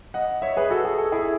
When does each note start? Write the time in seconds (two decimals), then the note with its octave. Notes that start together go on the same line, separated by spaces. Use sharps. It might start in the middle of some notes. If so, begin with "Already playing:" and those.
0.14 D#5 F#5
0.42 C#5 E5
0.57 G#4 B4
0.71 F#4 A4
0.85 G#4
0.98 A4
1.12 E4 G#4